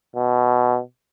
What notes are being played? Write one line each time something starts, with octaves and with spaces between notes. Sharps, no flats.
B2